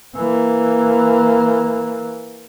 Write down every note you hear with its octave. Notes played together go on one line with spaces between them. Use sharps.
E3 A#3